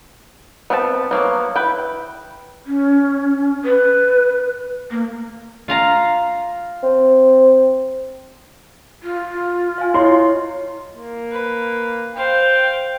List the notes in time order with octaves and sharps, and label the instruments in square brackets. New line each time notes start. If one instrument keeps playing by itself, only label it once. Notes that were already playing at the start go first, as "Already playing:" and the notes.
[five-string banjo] B3 C4 E5 G5 A5
F#3 A#3 B3
E4 B4 G5
[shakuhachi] C#4
B4
A#3
[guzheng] F4 F5 A#5
[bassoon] C4
[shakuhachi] F4
[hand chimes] F5 G#5
[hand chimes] E4 C#5 D#5 [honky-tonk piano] C6
[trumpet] A#3
[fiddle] B4
[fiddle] C5 F5 [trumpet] G5